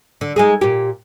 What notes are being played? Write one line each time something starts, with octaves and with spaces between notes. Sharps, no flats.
D3
G#3 D#4 G#4
A#2 G4